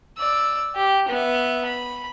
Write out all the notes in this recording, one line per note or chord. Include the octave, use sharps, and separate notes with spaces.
D5 E6
G4
B3 E5
B5